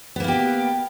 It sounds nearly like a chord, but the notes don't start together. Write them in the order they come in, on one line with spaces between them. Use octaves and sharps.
B3 A#3 E4 G4